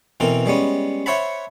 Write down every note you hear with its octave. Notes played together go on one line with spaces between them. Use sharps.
B2 E3 C4 A4 A#4
G3 G#3 B3 C#4
C5 C#5 E5 F#5 A5 B5